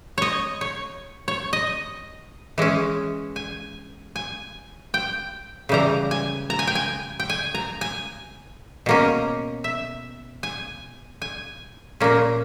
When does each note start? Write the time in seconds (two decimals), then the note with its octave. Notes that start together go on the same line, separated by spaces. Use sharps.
0.18 C#5 D#5
0.61 C#5
1.28 C#5
1.53 D#5
2.58 E3 G#3 C#4
3.36 G#5
4.16 G#5
4.94 G5
5.69 C#3 E3 G3 A#5
6.11 G#5
6.50 A#5
6.59 G#5
6.67 G5
6.75 G#5
7.20 G5
7.30 G#5
7.55 A#5
7.81 G#5
8.86 B2 A#3 C#4
9.64 E5
10.43 G#5
11.22 G#5
12.00 A#2 A#3 C#4